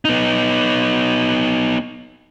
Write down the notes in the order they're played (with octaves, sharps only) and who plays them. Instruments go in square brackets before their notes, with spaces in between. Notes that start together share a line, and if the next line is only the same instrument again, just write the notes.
[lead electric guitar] B3 D#4